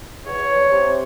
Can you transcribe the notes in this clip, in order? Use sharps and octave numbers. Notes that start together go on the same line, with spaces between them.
E2 C#5
E2
C3